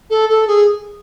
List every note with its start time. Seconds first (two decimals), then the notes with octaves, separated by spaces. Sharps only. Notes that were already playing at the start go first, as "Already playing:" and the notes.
0.10 A4
0.29 A4
0.47 G#4